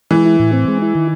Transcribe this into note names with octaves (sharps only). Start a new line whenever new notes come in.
E3 G#3
E4
A2
C4
G#3
E4
D#3